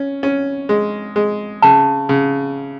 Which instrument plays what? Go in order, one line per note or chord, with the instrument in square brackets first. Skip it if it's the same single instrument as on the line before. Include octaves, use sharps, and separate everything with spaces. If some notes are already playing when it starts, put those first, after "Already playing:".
Already playing: [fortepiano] C#4
C#4
G#3
G#3
[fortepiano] C#3 [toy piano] A5
[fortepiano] C#3